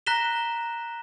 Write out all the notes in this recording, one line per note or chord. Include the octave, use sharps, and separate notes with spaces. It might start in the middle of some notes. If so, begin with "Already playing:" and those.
A#5 F#6 A#6 B6 E7 G7